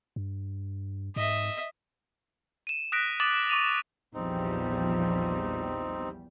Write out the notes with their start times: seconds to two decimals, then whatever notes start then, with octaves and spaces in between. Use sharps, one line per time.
0.16 G2
1.16 G#2 D#5 E5
2.67 D#7 E7
2.92 D#6 F#6 A#6 B6 D7
3.20 D6 D#6 A6 F#7
3.49 C#6 D6 D#7 F7
4.14 A#1 E2 F3 G3 C4 D#4